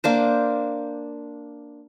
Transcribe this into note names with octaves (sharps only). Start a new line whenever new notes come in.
A#3 D4 C5